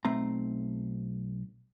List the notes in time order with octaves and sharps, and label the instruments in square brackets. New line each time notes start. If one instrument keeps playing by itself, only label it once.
[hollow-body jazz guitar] B1 A3 C4 A#5